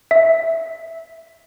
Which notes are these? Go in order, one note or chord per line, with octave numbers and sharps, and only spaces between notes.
E5